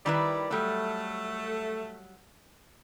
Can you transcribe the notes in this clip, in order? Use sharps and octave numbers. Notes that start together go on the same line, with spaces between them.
D#3 G3 E4 B4 D5
F#3 G3 A3